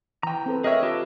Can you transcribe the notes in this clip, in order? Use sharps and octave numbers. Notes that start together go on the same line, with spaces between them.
E3 G5 A#5
C4 A4 B4
G#4 A#4 C#5 D#5 E5
F4 G4 A4 B4